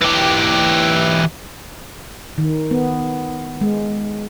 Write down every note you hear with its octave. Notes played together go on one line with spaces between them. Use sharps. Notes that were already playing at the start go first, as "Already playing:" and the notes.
E3 G4
D#3
B3
G#3